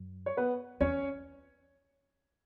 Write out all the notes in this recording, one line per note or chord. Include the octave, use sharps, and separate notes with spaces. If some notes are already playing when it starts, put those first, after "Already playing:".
Already playing: F#2
C#5
B3 B4
E2 C#4 C#5